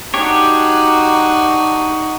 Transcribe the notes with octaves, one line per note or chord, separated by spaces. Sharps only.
D4 D#4 F#4 G4 C#5